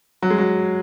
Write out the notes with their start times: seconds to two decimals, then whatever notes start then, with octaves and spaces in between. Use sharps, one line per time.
0.23 F#3
0.30 G#3
0.38 F#3